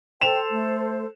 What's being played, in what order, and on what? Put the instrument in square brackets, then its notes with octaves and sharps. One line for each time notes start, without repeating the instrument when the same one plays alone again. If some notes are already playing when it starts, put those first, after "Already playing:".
[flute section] A4 C5 [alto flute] G5 [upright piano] E7 F7
[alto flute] A3